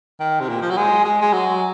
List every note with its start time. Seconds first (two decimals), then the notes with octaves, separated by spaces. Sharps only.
0.20 D#3
0.40 C3
0.49 A#2
0.62 F3
0.70 F#3
0.77 G#3
1.05 G#3
1.22 G#3
1.33 F#3